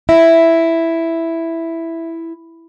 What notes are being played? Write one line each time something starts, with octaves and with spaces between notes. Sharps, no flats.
E4 E5